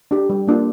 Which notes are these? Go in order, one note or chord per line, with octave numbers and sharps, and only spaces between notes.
D4 G4
G3
A#3 D4 F4